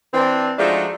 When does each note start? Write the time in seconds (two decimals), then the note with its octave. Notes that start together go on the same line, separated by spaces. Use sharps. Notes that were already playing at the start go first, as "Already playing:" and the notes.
0.13 E3 C4 D4
0.58 F3 G#3 A3 D4 D#4 F#4